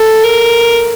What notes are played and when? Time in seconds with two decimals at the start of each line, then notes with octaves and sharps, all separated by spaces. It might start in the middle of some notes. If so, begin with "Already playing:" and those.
Already playing: A4
0.24 A#4